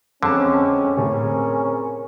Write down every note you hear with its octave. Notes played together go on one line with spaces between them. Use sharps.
F2 D3 G#3 C4 C#4 A4 A5
A2 C3 C4 C#4 G#4 A#4